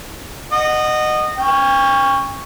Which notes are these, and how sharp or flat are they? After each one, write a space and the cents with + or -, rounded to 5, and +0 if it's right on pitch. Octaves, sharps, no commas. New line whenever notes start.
D#5 -20 F#5 +0
C#4 +0 G5 +40